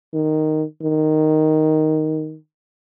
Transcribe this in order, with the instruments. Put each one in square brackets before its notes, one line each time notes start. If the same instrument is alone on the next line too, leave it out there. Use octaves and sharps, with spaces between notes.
[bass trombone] D#3
D#3